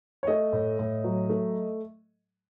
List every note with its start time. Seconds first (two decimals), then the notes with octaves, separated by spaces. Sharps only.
0.23 C#5
0.27 A3 D#5
0.53 A2
0.79 A2
1.04 F#3
1.30 A3